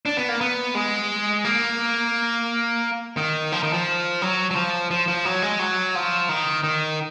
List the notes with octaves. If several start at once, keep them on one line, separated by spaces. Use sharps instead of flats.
D4
B3
A#3
B3
G#3
A#3
D#3
F3
D#3
F3
F#3
F#3
F3
F3
F3
F#3
G#3
F#3
F3
D#3
D#3